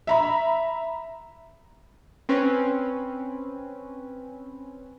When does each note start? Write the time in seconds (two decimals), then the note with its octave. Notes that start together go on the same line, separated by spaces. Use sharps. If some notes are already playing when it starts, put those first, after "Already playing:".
0.07 E5 A#5 B5
2.29 C4 C#4 B4